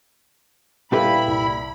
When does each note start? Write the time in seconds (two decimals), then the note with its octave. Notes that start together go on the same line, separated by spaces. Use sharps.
0.92 A#2 G3 E4 G4 A4 B4 F5 B5
1.28 C2